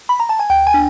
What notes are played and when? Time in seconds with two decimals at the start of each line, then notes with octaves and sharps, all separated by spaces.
0.09 B5
0.20 A#5
0.29 A5
0.39 G#5
0.50 D2 G5
0.67 G#5
0.74 D4